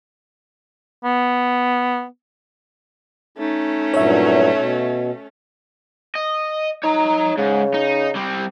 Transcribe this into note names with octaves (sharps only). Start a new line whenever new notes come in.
B3
A3 C#4 D#4
G2 A#2 F#3 C#5 E5
B2
D#5
D#4 C#5 A#5
G#2 C#3
D#4
G3 C4